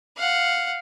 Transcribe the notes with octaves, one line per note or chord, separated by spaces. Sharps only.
F5 F#5